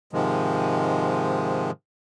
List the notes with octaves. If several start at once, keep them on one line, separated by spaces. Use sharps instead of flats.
G#2 C3 D#3 F3 G#3